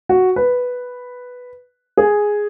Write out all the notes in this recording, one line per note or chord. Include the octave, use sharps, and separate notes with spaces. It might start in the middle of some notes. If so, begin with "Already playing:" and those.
F#4
B4
G#4